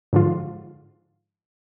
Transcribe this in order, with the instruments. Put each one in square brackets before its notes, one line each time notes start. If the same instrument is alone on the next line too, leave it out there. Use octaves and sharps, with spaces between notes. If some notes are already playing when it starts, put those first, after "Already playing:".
[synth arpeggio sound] G#2 D3 F3 F4